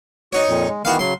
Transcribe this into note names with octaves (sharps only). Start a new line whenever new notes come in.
D#4 F#4 C#5
F2 A#2
G#3
D#3 E3 B3 F#4 F5
C#3 F#3 C6